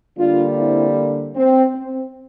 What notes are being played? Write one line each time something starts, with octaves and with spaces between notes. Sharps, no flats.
D3 G3 A#3 D4 F4
C4 E4
C4
C4